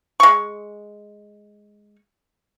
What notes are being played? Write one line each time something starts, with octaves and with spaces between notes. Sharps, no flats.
G#3 C#6